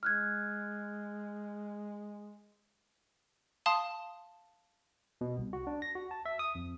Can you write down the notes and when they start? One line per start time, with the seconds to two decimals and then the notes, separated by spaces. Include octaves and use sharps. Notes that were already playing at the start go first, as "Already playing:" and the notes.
0.03 G#3 F6 F#6 G#6
3.66 F5 A5 C6 D#6
5.21 B2
5.38 C2
5.53 F#4
5.67 D4
5.82 A#6
5.95 F#4
6.11 A5
6.26 E5
6.39 D#6
6.55 F2